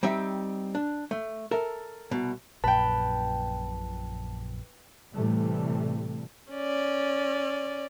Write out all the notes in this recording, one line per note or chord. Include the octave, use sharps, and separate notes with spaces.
G3 C4 D#4 E5
D4
A3
A4 A#4 E5
C2 B2
A#1 F#2 A#2 B4 G5 A5
A2 C3 E3 G3 A3
C#4 D5